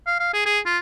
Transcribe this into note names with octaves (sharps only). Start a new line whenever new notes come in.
F5
F5
G#4
G#4
F4